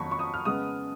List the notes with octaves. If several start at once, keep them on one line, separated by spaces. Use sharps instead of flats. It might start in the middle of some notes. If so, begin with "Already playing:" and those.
Already playing: F2 D#3 F#3 A#3 B5 C#6
C#6
D#6
F6
C#3 G#3 B3 D#6